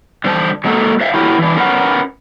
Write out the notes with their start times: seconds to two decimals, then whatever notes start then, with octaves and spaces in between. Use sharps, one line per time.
0.24 D3 G3 C5 G#5 A5
0.64 F#3 G#3 A#3 F#4 G4 A4
1.00 C5 E5 F5
1.14 E4 F#4 G4 A4 A#4 C#5
1.38 E3 D4
1.57 C#4 A#4 B4 F#5